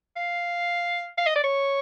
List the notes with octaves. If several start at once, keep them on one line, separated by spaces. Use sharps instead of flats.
F5
F5
D#5
D5
C#5